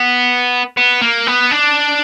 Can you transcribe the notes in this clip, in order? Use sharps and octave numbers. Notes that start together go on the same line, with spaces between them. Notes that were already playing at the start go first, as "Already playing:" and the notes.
Already playing: B3
B3
A#3
B3
D4